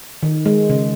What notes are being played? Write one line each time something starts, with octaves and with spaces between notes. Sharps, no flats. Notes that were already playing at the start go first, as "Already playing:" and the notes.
D#3
G#3
C#3